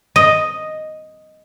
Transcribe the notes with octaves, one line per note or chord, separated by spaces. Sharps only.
D#5